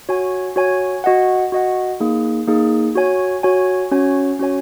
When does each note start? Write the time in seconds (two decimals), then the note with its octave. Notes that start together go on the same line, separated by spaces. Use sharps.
0.09 F#4 C#5 G#5
0.56 F#4 C#5 G#5
1.04 F#4 D#5 F#5
1.52 F#4 D#5 F#5
2.00 A#3 D#4 G#4
2.48 A#3 D#4 G#4
2.95 F#4 C#5 G#5
3.43 F#4 C#5 G#5
3.91 C#4 F#4 C#5 G#5
4.39 C#4 F#4 C#5 G#5